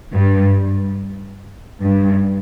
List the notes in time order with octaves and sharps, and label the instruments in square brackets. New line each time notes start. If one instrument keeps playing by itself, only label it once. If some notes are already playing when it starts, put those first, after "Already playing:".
[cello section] G2
G2